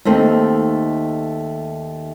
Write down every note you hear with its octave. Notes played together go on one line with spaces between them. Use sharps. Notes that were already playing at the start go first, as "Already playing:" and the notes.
D#2 A3 C4 D#4